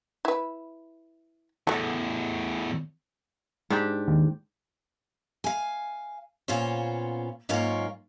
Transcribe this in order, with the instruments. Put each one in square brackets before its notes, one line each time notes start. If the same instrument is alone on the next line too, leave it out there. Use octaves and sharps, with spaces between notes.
[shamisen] E4 B4
[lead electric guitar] E2 A2 [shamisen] F#4 A4
[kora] G#2 D4 G4
[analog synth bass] D#2
[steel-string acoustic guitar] F5 G#5
A#2 B3 C#4 F4 C5 C#5
G#2 F#3 A#3 C#4 F4 C#5